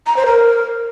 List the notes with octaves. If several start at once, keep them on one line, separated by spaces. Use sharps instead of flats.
A#5
C5
A#4